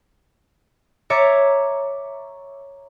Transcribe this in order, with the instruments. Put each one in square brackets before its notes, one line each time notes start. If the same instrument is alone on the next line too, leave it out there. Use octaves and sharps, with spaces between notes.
[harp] C#5 E5 A#5 D6 A6 C#7